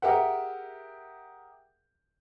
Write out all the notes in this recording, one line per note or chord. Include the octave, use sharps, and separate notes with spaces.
G4 G#4 A#4 E5 F#5